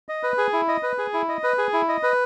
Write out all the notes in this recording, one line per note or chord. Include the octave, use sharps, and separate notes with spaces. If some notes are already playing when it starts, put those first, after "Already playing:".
D#5
B4
G#4
E4
D#5
B4
G#4
E4
D#5
B4
G#4
E4
D#5
B4